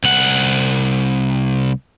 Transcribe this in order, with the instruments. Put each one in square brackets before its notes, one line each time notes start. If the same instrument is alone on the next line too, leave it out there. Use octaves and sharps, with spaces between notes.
[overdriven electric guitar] C2 F#5